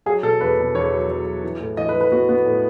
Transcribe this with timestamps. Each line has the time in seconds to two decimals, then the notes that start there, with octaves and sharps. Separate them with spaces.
0.06 F#3 G#4
0.23 B2 A4
0.41 E2 B4
0.58 B2
0.75 E2 C#5
0.92 F#3
1.09 F#3
1.26 F#3
1.44 E3
1.60 A2
1.77 E3 D#5
1.89 B4
1.94 E3
2.01 B4
2.12 B3 F#4
2.29 B3
2.46 A2